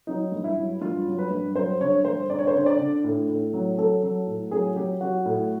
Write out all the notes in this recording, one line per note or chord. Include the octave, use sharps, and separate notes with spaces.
F#3 D#4
G2
E4
F#3
G2 F4
F#3
B4
G2
F#3 C5
D3 C#5
G2 C5
D3 D5
C#5
C5
D3 C#5
D5
D3
A2
A2
F#3
F#3 A4
F#3
A2
F#3 G#4
F#3 G4
F#3 F#4
A2